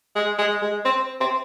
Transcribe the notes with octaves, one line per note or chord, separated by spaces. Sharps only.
G#3
G#3
G#3
C4
C4